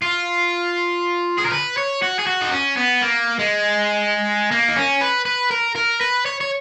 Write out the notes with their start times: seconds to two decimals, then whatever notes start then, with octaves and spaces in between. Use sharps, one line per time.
0.02 F4
1.38 G#4
1.45 A#4
1.52 B4
1.77 C#5
2.02 F#4
2.19 G#4
2.27 F#4
2.41 D#4
2.52 C#4
2.77 B3
3.01 A#3
3.39 G#3
4.51 A#3
4.68 D#4
4.76 C#4
5.01 B4
5.25 B4
5.51 A#4
5.76 A#4
6.01 B4
6.26 C#5
6.40 C#5